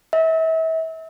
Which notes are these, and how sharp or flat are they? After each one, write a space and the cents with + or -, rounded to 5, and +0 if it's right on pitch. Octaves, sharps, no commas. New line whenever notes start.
E5 -35